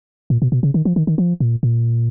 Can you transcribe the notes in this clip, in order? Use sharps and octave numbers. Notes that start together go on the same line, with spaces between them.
A#2
B2
B2
C#3
D#3
F3
D#3
D#3
F3
A#2
A#2